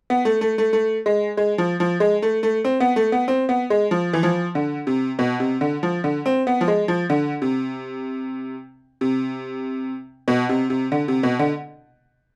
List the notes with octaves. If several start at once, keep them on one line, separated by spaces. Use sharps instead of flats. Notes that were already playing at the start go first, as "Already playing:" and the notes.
B3
A3
A3
A3
A3
G#3
G#3
F3
F3
G#3
A3
A3
C4
B3
A3
B3
C4
B3
G#3
F3
E3
F3
D3
C3
B2
C3
D3
F3
D3
C4
B3
F3
G#3
F3
D3
C3
C3
B2
C3
C3
D3
C3
B2
D3